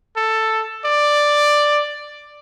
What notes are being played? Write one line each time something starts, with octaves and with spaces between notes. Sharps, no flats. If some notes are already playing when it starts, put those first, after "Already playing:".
A4
D5